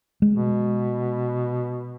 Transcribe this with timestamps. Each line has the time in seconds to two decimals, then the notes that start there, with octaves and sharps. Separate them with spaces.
0.22 G#3
0.35 B2